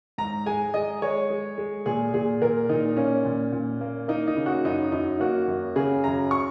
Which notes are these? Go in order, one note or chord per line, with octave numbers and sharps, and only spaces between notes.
G#2 A#5
G#3 G#5
G#3 D#5
G#3 C#5
G#3
G#3
A#2 G#4
A#2 G#4
A#2 A#4
A#2 D#4
A#3 C#4
A#2
A#2
A#3
A#3 D#4
D#4
C#3
F#4
F#2 D#4
F#2 D#4
A#3 F#4
F#2
C#3 G#4
F#2 A#5
C#6